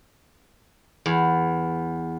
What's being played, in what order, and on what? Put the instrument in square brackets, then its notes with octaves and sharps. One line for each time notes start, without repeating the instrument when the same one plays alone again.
[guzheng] E2